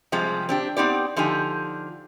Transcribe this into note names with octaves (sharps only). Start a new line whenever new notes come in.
C3 F3 G3 G#3
C4 D4 G4
B3 C4 D#4 G4 D5
D3 F3 D#4 G4 G#5